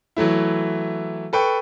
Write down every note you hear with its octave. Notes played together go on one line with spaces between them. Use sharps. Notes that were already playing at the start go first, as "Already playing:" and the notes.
E3 F#3 A3 E4
A4 B4 G5 C#6